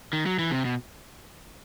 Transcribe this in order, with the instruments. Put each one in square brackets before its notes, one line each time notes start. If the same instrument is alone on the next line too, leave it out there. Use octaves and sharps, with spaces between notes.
[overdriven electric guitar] D#3
F#3
E3
C3
B2